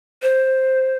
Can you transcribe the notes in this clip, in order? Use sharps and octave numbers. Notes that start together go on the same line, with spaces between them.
C5